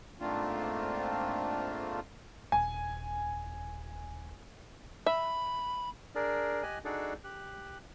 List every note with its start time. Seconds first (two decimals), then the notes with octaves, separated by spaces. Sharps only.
0.20 G#2 A3 A#3 C4 D4 F4
2.52 D#1 G#5
5.06 E5 B5
6.15 D4 G#4 A#4 D5
6.63 G4 D#5 G#5 F#6
6.85 D4 D#4 F#4 G#4 A4 D5
7.24 G4 F#6